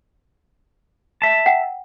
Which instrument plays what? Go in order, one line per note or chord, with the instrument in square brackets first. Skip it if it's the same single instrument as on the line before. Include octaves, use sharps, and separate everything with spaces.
[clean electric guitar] E5 A5
[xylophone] F#5 G5